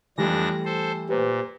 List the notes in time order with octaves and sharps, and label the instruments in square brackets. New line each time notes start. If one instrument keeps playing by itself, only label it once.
[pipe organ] F2 D4 A#6 [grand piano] E3 G3 A3
[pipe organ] A4 C5
[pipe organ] A#2 [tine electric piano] G4 B4 C5